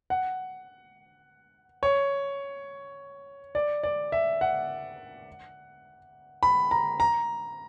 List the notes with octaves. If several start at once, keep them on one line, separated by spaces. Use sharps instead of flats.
F#5
C#5
D5
D5
E5
F#5
B5
A#5
A#5